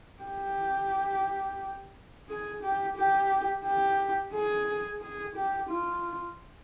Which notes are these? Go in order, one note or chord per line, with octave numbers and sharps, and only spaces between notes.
G4
G#4
G4
G4
G4
G#4
G#4
G4
F4